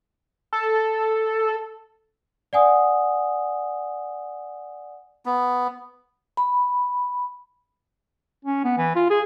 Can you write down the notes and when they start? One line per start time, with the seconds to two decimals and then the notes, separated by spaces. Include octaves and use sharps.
0.53 A4
2.53 D5 F#5 G#5 D#6
5.26 B3
6.37 B5
8.45 C#4
8.64 B3
8.77 E3
8.96 F4
9.10 G#4